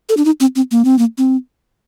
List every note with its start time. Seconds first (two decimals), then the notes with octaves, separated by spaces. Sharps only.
0.09 A4
0.17 D4
0.25 D#4
0.40 C4
0.56 C4
0.71 A#3
0.85 C4
0.98 A#3
1.18 C4